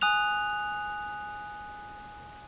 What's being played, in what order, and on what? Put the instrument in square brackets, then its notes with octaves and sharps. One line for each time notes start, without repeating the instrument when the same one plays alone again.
[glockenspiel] G#5 D#6 F#6 F7